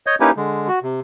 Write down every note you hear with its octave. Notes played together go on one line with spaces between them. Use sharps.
C#5 D#5 G6
A#3 C#4 D#4 E4 G4 B4
D3 G#3
F#4
C3